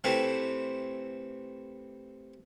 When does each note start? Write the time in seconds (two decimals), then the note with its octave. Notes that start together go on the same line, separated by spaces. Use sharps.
0.04 C3 E3 A3 C4